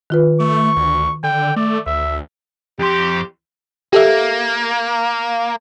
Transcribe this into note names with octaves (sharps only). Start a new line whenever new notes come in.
D#3 F4 B4
A3 C#6
D2
D3 G5
A3 D5
D2 E5
F2 G4 C6
A#3 G4 A4 E5